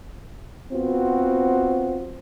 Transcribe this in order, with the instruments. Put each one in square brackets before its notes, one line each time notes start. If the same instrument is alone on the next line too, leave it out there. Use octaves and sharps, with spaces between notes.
[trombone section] B3 C4 F4 F#4